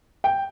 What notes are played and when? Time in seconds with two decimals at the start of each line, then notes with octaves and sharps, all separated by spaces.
0.24 G5